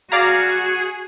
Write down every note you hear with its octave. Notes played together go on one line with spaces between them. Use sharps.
F#4 G#4 D5 F5 A#5